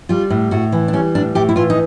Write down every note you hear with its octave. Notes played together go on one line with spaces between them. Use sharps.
G3 F4
A2
A2 F#4
E3
D4
G3 C#4
A2 D4
A2 G4
E4
E3 F4
D#4